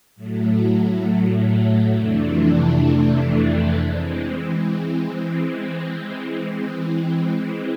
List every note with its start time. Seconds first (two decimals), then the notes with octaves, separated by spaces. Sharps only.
0.16 A2 F#3 A3
1.95 F2 C3 E3 A3 D4
3.74 E3 G#3 C4